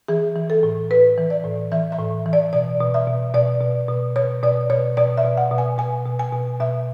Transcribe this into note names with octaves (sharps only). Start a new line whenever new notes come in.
E3 G#4
E3
A4
A2
A2 B4
E3
D5
A2
E3 E5
E5
A2
E3
D5
B2 D5
B2
E5
B2
B2 D5
B2
B2
B2 C#5
B2 D5
B2 C#5
B2 D5
E5
B2
F#5
B2
G#5
B2 G#5
B2
G#5
B2
B2 E5